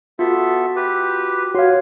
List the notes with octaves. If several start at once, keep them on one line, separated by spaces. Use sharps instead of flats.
B3 F4 F#4 A4 E5
G4 B4
F#4 C#5 F5 C6